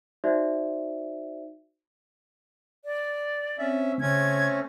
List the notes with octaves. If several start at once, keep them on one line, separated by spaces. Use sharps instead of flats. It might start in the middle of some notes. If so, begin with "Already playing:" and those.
D#4 F#4 C5 D5 E5
D5
C4 C#4 E5
C#3 A3 C4 C#4 G#6